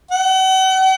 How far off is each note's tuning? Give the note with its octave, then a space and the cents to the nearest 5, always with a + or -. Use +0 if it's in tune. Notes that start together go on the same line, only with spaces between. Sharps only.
F#5 +40